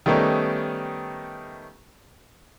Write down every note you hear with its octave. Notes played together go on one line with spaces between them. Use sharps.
D#3 G3 A3 B3 C#4 D#4